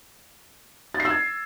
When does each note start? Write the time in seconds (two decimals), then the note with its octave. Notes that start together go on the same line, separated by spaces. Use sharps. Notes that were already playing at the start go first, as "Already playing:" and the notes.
0.94 A6
1.00 C7
1.05 E6
1.10 G#6